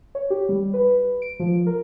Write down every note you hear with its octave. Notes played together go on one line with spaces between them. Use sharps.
C#5
G4
G3
B4
D7
F3
A#4